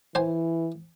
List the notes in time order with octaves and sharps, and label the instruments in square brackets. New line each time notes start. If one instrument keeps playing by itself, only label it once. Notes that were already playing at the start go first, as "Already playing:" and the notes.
[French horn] E3 [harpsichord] C5 G#5